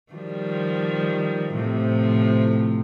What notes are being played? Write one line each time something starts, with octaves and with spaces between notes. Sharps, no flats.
D#3 F3 G3
A2 C3 F3